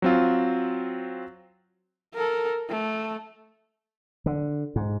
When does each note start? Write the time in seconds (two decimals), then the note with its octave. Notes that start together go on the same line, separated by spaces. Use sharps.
0.02 F#3 C4 F4
2.15 A4 A#4
2.70 A3
4.26 D3
4.76 G#2